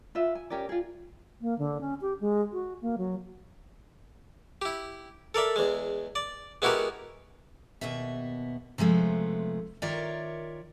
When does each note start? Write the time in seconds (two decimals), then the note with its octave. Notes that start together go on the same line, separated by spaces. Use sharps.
0.15 F4 B4 E5
0.35 G#5
0.50 C#4 G4 A#4 D5
0.69 F4 G#4
1.41 A#3
1.59 D3
1.81 C#4
2.01 G4
2.20 G#3
2.53 F#4
2.82 A#3
2.98 F#3
4.62 E4 G4
5.34 A4 A#4 D5 E5
5.56 E2 G#3
6.15 D5
6.62 G#3 B3 E4 F#4 G4 A#4
7.81 D#2 B2 B3 E5
8.78 C3 F3 G#3 A3 B3
9.82 D#3 F4 A#4 C#5 D5 E5